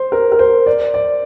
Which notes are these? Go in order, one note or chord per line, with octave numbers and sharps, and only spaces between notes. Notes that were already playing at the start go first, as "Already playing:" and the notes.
Already playing: C5
A#4
A#4
C5
D5
D5